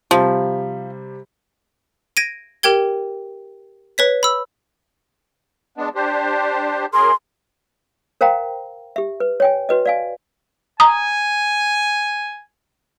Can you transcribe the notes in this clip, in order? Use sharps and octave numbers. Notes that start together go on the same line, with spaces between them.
C3 F3 G3
G#6 A#6 D7 D#7
G4 A#4 G5 G#6 G7
B4 C#5 B6
B5 E6
G#3 B3 D4
D4 G4 C5
F#2 G#4 A#4 C6
A#4 C5 F5 G5 A#5
G4 E5
B4
C#5 G5 G#5
F#4 B4 D#5
D5 F5 G#5
G#5 A#5 D#6